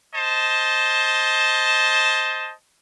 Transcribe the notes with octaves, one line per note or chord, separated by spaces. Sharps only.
C5 D#5 A5